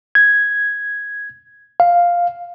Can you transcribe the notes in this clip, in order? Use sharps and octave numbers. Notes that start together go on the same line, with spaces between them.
G#6
F5